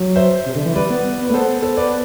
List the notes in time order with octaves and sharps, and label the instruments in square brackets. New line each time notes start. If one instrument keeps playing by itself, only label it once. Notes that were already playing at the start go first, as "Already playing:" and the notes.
Already playing: [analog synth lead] F#3
[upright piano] C5 E5
[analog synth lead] C3
D3
E3
[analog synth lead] G3 [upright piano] B4 D5
[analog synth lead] B3
[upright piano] B4
[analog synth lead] A3
[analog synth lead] B3 [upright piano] A4 C5
[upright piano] A4 C5
B4 D5